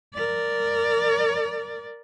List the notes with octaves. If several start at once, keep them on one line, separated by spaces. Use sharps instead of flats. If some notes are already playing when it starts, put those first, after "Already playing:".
A#4 D5